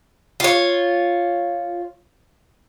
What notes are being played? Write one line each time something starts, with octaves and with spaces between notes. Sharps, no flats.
F4 C#5